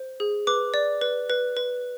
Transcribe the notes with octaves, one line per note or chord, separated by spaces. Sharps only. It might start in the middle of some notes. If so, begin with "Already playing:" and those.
Already playing: C5
G#4
B4 D6
D5
B4
B4
B4